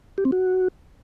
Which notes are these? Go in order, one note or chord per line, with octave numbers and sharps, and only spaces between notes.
G4
C4
F#4